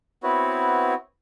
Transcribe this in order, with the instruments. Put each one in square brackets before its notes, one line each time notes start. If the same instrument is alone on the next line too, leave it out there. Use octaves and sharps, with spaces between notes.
[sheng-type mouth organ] B3 C4 E4 F#4 B4 C#5